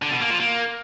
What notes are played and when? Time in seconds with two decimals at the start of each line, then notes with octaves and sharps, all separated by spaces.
0.02 D3
0.12 B2
0.21 A#3
0.31 F3
0.40 A#3